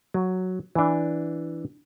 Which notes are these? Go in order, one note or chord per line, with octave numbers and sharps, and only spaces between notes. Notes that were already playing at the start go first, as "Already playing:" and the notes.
F#3
E3 D4